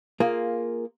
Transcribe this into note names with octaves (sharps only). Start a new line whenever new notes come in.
A#3 F4 G#4